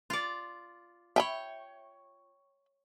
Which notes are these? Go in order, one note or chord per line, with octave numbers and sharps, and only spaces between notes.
F4 D5
C#5 E5 G5 G#5 B5